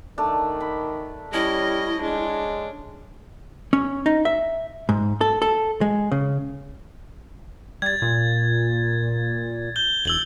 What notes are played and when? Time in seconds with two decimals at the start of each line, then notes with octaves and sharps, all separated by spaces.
0.18 D#3 A3 D4
0.60 B5
1.33 G3 C#4 E4 D#5
2.02 G#3 D4
3.73 C#4
4.06 D#4
4.25 E5
4.89 G#2
5.21 A4
5.42 A4
5.81 G#3
6.12 C#3
7.82 G3 G#6 A6
8.02 A#2
9.76 G6 G7
10.05 E1 E6 F#7 G7